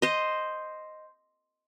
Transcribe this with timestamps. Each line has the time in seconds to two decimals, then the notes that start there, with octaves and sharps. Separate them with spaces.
0.02 C5 D#5